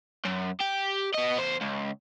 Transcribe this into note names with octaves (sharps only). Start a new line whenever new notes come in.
F#2
G4
B3 D#5
E2 C5
C#2